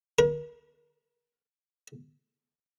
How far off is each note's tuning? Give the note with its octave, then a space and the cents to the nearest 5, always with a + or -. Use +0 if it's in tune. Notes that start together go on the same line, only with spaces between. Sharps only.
A#4 +40